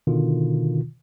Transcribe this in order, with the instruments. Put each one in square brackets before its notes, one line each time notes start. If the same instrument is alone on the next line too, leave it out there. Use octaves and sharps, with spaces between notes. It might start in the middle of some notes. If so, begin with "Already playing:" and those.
[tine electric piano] B2 D3 D#3 F4